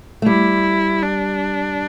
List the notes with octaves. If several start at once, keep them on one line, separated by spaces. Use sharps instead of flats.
A3
G3 E4
D4